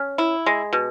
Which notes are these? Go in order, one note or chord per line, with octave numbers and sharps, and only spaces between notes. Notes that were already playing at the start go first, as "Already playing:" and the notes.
Already playing: C#4
E4
G#3
B2